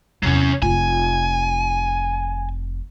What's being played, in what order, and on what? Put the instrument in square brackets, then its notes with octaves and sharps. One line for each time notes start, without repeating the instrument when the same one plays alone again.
[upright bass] E2 C3 [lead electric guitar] F#3 C#4
[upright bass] F1 F4 [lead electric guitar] G#5